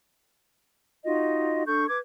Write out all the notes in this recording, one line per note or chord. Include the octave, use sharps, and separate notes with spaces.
D#4 F4 F#4 D#5
D4 A4 C#6 G6
B4 D6 G#6